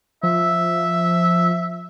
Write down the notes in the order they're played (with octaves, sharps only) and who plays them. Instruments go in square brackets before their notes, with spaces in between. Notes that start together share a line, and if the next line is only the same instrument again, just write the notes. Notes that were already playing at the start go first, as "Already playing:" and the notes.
[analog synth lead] F3 [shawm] E5